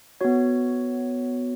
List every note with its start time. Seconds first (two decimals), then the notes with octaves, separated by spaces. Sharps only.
0.21 B3 F#4 C#5